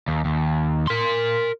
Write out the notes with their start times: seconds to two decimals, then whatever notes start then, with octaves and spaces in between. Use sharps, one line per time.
0.08 D#2
0.25 D#2
0.87 A#4 C6